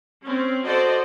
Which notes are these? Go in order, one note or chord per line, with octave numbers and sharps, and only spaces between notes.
C4 C#4
F#4 A4 C5 D5 D#5